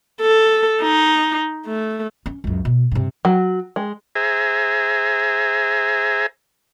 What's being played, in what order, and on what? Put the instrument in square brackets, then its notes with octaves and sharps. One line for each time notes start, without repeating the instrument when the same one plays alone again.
[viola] A4
D#4
A3
[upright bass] C#4
C#2 F#2
B2
G2 C3
[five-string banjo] F#3
G#3
[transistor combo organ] G#4 C5 E5 G#5 A#5